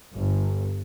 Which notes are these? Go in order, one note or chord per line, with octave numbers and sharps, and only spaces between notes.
G1